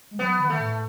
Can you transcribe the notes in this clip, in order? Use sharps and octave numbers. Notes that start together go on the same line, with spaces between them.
G#3
F#3 B3
D#3
A3
A2